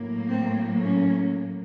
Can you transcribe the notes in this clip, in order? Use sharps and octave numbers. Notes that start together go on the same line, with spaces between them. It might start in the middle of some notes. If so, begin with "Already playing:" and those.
Already playing: A2 F#3 A#3
C4
C#4